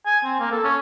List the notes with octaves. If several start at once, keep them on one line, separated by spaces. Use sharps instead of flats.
G#5
C4
A#3
A4
C#4